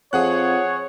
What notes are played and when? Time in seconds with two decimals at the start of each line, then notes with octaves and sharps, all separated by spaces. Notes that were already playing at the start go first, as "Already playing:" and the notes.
0.13 F2 G#4 C#5 F#5 F#6